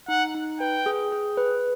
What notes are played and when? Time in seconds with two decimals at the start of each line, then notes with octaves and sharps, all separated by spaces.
0.08 D#4 F#5
0.35 D#4
0.60 B4 G5
0.86 G#4
1.12 G#4
1.37 B4